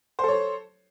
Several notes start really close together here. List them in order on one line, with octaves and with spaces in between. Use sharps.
C5 A4 C#5